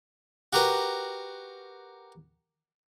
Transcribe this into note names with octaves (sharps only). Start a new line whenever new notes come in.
F#4 G4 A#4 B4 A#5